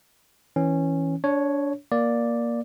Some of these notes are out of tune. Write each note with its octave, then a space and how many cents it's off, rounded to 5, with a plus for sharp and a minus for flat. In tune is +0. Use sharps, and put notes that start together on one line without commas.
E3 -20 C#4 -15
D4 -30 C#5 +0
A#3 +10 D5 +0